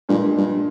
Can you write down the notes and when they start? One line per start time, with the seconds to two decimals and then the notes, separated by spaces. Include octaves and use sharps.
0.09 G2 A#2 F3 G#3
0.37 G2